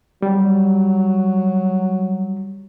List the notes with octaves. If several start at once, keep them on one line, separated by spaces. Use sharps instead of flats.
F#3 G3